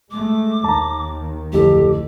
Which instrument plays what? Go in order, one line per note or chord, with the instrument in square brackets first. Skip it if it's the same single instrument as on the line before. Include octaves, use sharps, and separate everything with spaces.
[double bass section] G#3 A3 [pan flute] D6
[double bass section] D#2 D#3 [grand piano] A5 A#5
[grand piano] D1 F2 A4 [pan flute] G4